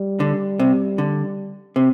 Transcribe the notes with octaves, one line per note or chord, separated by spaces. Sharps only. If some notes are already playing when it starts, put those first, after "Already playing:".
Already playing: G3
D3
C3
D3
C3